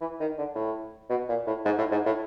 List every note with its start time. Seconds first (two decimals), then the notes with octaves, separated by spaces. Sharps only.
0.01 E3
0.20 D#3
0.38 D3
0.55 A2
1.10 B2
1.29 A#2
1.47 A2
1.65 G#2
1.78 A2
1.91 G#2
2.06 A2